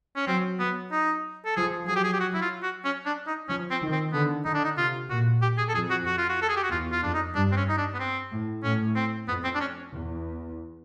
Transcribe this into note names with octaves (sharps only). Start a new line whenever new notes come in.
C#4
F#3 C4
F#3 B3
D#4
A4
F3 G#4
F#3 G#4
G4
G#4
G4
F#4
E4
F4
F#4
C#4
D4
D#4
F3 C#4
C4
D#3
C4
D3 B3
D3 D#4
D4
D#4
C3 F4
A#2 F#4
G4
G#4
A4
F2 G#4
F#4
F#4
F4
F#4
A4
G#4
G4
F#4
E2 F4
F4
F2 D4
D#4
G2 D4
C4
C#4
D#4
D4
B3
C4
A2
A2 C#4
C4
F2 B3
C4
D4
C#4
E2